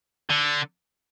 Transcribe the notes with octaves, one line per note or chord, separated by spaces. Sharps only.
D3